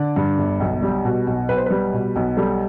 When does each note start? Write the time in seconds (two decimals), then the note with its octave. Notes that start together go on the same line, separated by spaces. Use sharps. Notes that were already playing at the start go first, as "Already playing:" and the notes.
Already playing: D3 D5
0.16 G2
0.38 G1
0.60 B1
0.82 G3
1.05 B2
1.27 B1
1.49 B1 B4
1.57 C5
1.66 G3 B4
1.94 B2
2.16 B1
2.37 G3 A4